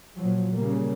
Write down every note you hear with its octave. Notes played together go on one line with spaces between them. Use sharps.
A#2 F3 F#3
A#2 C#3 G3 A#3